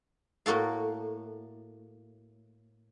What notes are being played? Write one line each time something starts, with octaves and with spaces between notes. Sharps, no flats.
A2 A#3 F#4 A4 F5